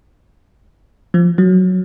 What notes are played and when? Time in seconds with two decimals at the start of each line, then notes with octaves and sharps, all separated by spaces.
1.14 F3
1.38 F#3